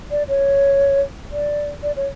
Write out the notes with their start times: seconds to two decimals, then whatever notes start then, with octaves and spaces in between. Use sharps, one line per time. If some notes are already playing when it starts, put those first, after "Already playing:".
0.11 D5
0.29 C#5
1.32 D5
1.83 D5
1.96 C#5